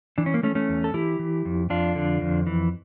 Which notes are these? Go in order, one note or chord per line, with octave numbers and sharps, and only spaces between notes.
E3 D4
C#4
A#3
E3 A3 C#4
A3 C#4
E2
A4
E3 E4 G4
E3
F2
F2 D4 F4
D3
F2
E3